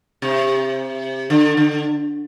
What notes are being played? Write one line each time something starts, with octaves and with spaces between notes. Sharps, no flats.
C3
D3
D3